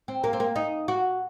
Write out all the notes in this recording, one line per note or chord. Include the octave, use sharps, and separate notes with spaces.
C4
A#3
C4
A#3
D#4
F#4